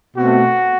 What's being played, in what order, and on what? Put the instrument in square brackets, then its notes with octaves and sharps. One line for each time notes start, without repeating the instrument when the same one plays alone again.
[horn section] B2 A3 C4 F#4